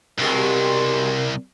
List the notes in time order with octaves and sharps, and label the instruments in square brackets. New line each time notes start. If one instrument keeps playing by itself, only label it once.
[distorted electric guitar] C2 [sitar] G2 B2 G#3 [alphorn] A#4